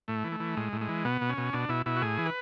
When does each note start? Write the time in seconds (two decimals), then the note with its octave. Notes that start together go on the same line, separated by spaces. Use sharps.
0.08 A2 A3
0.24 E3
0.32 A3
0.40 E3
0.57 A2 G#3
0.73 A2
0.81 G#3
0.89 E3
1.05 B2 B3
1.21 B2
1.29 C#4
1.38 B2
1.53 B2 D4
1.69 B2 E4
1.86 B2 E4
1.96 F#4
2.02 A2 G#4
2.18 E3
2.26 B4